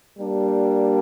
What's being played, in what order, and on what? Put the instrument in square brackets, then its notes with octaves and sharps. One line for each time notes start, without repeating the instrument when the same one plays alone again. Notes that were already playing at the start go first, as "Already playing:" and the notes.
[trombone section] G3 A#3 D4